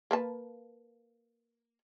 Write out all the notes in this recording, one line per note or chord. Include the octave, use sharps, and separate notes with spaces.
A#3 B4 A5